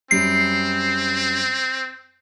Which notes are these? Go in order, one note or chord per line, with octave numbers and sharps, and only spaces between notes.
F#2 G3 C4 C7 D7